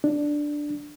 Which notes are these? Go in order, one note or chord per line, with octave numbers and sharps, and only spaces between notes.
D4